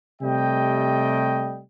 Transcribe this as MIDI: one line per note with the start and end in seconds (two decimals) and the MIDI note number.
0.22 1.61 48
0.22 1.61 55
0.22 1.61 57
0.22 1.61 75
0.22 1.61 79